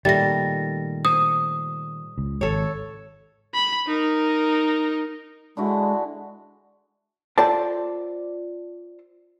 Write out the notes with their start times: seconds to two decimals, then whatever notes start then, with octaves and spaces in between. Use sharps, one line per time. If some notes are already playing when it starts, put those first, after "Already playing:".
0.05 A#2 D#3 G3 A3 A6 A#6
1.05 C5 D#6
2.18 C#2
2.41 G#1 A4 C#5
3.54 B5
3.87 D#4 A#4
5.57 D3 G#3 E4 F#4
7.38 F4 A4 C5 D5 G5 A5